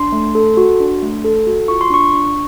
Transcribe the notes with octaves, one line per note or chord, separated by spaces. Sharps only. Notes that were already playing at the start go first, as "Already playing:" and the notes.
Already playing: D4 C6
A3
A4
F#4
D4
A3
A4
F#4
F4 C#6
C6
D4 C#6
D4